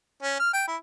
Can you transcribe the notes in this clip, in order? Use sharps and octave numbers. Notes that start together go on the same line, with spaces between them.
C#4
F6
G5
E4